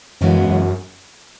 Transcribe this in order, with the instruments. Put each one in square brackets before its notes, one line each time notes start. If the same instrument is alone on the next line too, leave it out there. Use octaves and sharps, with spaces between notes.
[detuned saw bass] F#2 [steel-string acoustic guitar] C#3 E3 G#3 B3 F#4
[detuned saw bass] F#2